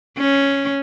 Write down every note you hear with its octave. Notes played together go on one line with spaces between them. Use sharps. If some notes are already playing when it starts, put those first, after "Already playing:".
C#4